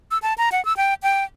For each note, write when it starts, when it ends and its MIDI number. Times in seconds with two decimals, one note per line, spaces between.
0.11 0.18 88
0.22 0.34 81
0.38 0.49 82
0.52 0.64 78
0.65 0.76 88
0.77 0.94 79
1.03 1.24 79